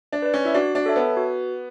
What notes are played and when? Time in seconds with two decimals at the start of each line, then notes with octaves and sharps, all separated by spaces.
0.12 D4
0.22 B4 D5
0.34 C#4
0.45 E4
0.54 D4 F#4
0.75 D4
0.86 A4 C#5 E5 A5
0.96 B3
1.17 F#4